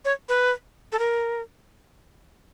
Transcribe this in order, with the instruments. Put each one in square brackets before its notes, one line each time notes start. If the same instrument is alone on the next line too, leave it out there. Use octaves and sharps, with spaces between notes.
[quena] C#5
B4
A4
A#4